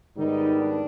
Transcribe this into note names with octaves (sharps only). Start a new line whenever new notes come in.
G#2 D#3 G3 B3 D#4
D4